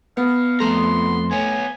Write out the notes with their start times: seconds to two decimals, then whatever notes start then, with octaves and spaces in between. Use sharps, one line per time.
0.17 B3 F5
0.60 F2 A3 A4 A#5 C6
1.31 B3 C#5 G#5